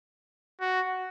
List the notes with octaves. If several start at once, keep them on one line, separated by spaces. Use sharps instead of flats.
F#4